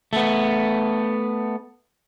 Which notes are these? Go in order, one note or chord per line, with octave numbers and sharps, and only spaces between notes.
A3 B3